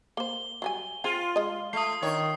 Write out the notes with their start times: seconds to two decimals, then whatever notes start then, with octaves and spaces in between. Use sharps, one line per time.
0.17 A#3 C5 G7
0.62 F#3 G3 G#5
1.04 C4 F4 G#4
1.36 G#3 D#5
1.73 A3 D#6 C7
2.02 D#3 D4 C#5